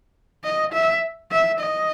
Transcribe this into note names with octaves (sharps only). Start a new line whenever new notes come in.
D#5
E5
E5
D#5